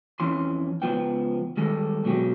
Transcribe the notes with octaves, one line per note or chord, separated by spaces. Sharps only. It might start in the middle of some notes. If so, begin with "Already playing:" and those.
F2 E3 C#4 C6
C#2 F3 B3 G5
D#3 G3 G#3 A4
B2 D3 F#3 G#3 G4 G#4